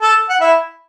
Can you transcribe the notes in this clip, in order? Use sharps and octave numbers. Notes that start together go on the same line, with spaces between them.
A4 A5
F#5
E4 E5